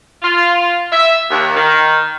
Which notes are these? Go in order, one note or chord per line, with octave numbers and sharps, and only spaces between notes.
F4
E5
D#2
D#3